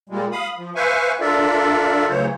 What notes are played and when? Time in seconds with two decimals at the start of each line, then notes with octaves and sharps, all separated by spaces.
0.09 A#2 G3 G#3
0.32 F5 B5 D#6
0.57 F3
0.75 B4 C5 E5 F5 G#5 C#6
1.21 D4 F4 A4 A#4 D5 E5
2.09 D2 C#3 E3 F#3 C5 C#5